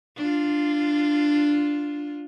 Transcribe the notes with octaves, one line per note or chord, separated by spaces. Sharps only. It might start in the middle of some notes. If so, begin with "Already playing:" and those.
D4 F4